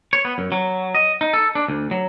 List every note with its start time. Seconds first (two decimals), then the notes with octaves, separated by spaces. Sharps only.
0.13 C#5
0.25 B3
0.38 F#2
0.52 F#3
0.95 D#5
1.21 D#4
1.33 A4
1.55 D4
1.68 D2
1.91 F#3